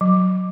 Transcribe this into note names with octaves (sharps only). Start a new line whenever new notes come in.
F#3